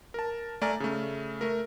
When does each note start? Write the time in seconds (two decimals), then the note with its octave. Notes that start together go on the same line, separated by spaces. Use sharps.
0.14 A#4 A5
0.61 A3 D5 G#5 A#5 F6
0.80 C#3 A3
1.41 A3 A#4